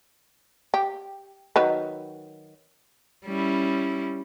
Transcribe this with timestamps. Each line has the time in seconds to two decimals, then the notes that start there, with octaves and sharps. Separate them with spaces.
0.74 G4
1.56 D#3 F#3 B4
3.26 G3 C#4 E4